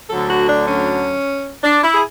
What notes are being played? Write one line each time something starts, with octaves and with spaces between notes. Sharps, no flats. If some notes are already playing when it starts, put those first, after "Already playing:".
D2 D3 F#3 A4
F#4
D4
C#4
D4
E4
G#4